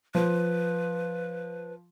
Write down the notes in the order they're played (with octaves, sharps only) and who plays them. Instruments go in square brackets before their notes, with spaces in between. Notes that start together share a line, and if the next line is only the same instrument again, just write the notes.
[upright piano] F3 [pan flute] B4